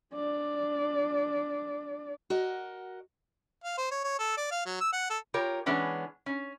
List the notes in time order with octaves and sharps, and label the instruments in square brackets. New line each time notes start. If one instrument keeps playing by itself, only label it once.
[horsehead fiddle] D4 D5
[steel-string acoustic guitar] F#4 A#4 D#5
[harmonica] F5
C5
C#5
C#5
A4
D5
F5
F#3
E6
F#5
A4
[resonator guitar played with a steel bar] F4 G4 A#4 C#5
E3 G#3 B3 C#4 D4
C#4